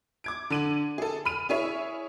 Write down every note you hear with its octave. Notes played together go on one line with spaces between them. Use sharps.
D6 G#6 D7
D3 D#7 F#7
G#4 A4
B5 F6 D#7
E4 G#4 C#5 E5